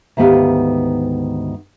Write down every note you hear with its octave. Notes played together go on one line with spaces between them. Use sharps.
D2 G#2 D#3 B3 G4 F5